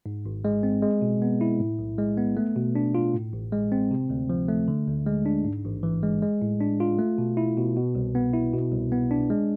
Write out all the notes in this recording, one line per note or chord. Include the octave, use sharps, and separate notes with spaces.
G#2
G#1
G#3
C4
G#3
B2
B3
E4
A2
B1
G#3
B3
A3
B2
D4
F4
A2
A1
G#3
C4
C3
D2
F3
A3
D3
D2
G#3
D4
G#2
A1
E3
G#3
G#3
A2
D4
F4
A3
B2
E4
B2
B2
C2
B3
E4
B2
C2
B3
D4
G#3